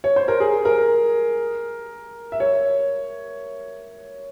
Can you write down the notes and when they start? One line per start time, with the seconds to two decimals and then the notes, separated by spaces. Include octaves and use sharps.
0.04 C#5
0.16 C5
0.28 A#4
0.40 G#4
0.65 A#4
2.32 E5
2.40 C#5